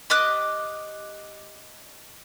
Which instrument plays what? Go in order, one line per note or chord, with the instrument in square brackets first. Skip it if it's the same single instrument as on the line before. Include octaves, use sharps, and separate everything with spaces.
[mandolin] G4 D#5 D6 F#6